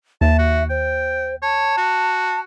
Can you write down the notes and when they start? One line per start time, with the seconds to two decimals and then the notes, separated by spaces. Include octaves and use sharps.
0.21 D#2 E5 A5
0.38 F#4
0.70 C5 G5
1.42 C#5 A5
1.77 F#4